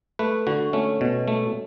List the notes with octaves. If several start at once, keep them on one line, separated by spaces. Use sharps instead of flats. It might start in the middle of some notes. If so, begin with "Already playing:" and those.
A3 B4
D3 F#4
A3 C#4
B2
A3